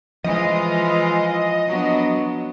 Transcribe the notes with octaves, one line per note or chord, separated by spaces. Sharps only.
E3 F3 G#3 F4 D#5
F#3 B3 D4